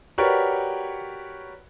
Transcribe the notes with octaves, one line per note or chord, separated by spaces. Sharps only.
F#4 G4 A#4 B4 C#5 D5